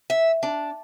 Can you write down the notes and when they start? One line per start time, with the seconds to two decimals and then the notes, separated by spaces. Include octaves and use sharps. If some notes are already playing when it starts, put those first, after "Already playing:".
0.10 E5
0.43 D4